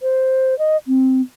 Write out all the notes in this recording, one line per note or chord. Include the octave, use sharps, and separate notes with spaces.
C5
D#5
C4